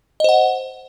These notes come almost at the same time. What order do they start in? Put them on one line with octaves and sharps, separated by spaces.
D#5 C5 F#5